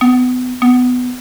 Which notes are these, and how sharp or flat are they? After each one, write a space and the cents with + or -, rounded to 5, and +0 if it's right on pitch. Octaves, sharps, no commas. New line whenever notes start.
B3 +30
B3 +15